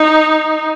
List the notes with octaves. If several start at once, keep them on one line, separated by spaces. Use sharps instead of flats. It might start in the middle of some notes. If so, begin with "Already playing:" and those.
Already playing: D#4